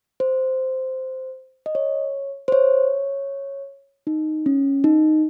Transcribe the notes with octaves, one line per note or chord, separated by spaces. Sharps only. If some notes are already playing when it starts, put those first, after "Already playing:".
C5
D#5
C#5
C5
C#5
D#4
C#4
D#4